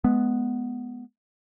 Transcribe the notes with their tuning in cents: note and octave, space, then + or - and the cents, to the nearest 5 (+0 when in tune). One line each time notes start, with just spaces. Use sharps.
G#3 +25 B3 +0